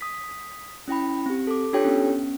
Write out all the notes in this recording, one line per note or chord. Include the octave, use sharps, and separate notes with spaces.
D#6 B6
C#4 E4 G5 B5
C4 G4
A4 D6
D4 F4 G4 A4 C#5 G5
B3 C#4